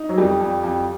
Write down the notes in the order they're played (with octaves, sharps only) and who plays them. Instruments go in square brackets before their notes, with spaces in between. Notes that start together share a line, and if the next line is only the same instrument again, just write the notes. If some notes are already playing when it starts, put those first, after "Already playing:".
Already playing: [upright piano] D#4
[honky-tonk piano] F#3
[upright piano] F2 [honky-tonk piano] G3
[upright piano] F2
F2